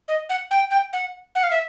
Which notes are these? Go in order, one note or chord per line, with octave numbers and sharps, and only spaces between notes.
D#5
F#5
G5
G5
F#5
F#5
F5
E5